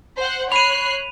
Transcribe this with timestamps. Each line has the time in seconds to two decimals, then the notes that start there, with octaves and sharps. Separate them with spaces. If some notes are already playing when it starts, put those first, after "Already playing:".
0.17 C5 F#5
0.52 C#5 B5 F#6 C7 D#7 F7